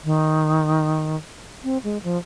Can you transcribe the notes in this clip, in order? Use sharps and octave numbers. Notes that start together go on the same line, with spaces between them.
D#3
C4
G#3
F3